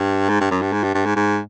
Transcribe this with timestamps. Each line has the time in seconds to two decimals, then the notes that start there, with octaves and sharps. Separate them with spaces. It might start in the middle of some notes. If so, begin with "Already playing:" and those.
Already playing: G2
0.29 G#2
0.41 G2
0.51 F#2
0.62 G2
0.73 G#2
0.83 G2
0.95 G2
1.06 G#2
1.16 G#2